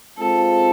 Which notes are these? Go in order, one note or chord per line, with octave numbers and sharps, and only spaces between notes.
G#3 C4 F4 A4